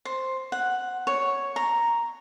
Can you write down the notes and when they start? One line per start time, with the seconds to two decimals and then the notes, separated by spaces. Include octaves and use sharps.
0.05 C5
0.52 F#5
1.07 C#5
1.56 A#5